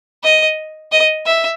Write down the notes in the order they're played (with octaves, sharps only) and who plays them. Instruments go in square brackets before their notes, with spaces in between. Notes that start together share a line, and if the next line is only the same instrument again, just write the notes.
[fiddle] D#5
D#5
E5